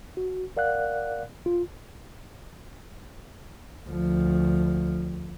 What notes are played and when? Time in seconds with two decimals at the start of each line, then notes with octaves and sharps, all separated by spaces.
0.17 F#4
0.57 A#4 D5 F5 F#5 F#6
1.46 F4
3.89 D2 F3